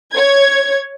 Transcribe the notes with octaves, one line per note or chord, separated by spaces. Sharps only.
C#5 G#6